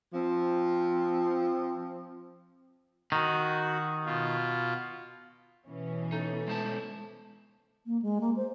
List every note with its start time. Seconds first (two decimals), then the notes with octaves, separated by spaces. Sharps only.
0.13 F3 C4
3.12 D#3 F#4
4.05 B2 F4
5.66 B2 E3 C#4
6.12 A3 D#4
6.48 G#3 C5 A5
7.86 A#3
8.02 G#3
8.21 A#3
8.37 C5